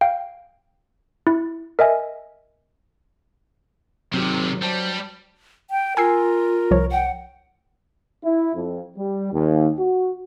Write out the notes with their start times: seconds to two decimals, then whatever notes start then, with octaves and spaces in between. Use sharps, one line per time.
0.01 F5 G5
1.27 E4
1.79 A#4 D#5 E5 G#5
4.14 G#1 C3 D#3 F#3 C4 G4
4.63 G2 G3 F#4 C5 D5 A5
5.71 G5
5.97 F4 A#4 G#5 E6 C7
6.71 C2 F3 C#5
6.92 F#5 G5
8.24 E4
8.56 F2
8.97 G3
9.33 D#2
9.78 F#4